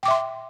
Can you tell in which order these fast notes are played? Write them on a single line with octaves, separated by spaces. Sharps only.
G5 D6 E5 C6